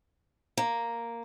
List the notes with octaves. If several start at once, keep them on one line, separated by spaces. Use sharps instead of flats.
A#3